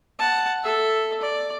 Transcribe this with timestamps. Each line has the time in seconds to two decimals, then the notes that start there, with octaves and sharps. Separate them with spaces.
0.19 F#5 A5
0.64 A4 E5
1.21 D5